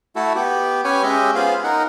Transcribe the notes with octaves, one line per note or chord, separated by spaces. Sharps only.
A3 E4 F#4 A4
B3 G4
C#4 G4 B4 C#5 G#5
G#3 C#4 G4 D#5 E5
B3 F4 G#4 C5 F5
D#4 A#4 F#5